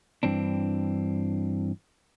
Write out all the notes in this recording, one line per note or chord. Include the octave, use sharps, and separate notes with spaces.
G2 E3 C4 D4